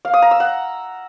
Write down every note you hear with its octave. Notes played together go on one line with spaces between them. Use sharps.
F5
D#6
A#5
E6
F#5